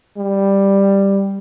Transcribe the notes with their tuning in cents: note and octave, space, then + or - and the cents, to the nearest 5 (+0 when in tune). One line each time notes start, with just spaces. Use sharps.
G3 +5